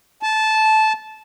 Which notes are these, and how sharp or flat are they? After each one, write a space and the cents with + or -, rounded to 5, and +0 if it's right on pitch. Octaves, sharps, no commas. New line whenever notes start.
A5 -15